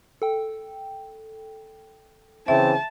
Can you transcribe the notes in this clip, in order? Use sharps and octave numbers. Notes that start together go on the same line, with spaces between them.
A4 G5
C#3 E3 C4 E5 A5